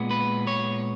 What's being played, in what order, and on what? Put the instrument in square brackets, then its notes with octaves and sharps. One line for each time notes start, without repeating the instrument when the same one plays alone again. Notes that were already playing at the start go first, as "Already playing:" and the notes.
Already playing: [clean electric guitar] A#2 G#3 B3
B4
C#5